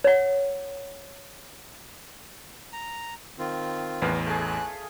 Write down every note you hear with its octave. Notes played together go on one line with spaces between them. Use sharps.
C#5 F#5
A#5
D#3 C4 F4
A1 E2 B4 F5
A3 G#4 F#6